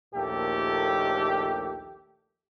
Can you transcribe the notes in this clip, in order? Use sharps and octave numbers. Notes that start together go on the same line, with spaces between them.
A#1 D#2 A#2 A3 G4 A4